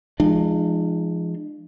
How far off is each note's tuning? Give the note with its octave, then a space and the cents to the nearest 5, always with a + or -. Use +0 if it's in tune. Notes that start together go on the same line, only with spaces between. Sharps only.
F3 -35 G#3 +0 D4 +40